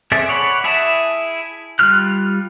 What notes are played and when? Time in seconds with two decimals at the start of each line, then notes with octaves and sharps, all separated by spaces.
0.12 C4 G#4 A4 D5 E5
0.29 C#5 D5 F#5 B5
0.64 E4 G#4 E5 A5
1.79 G3 F4 F6 F#6